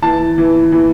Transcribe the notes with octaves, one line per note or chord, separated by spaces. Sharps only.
E3 A5
E3
E3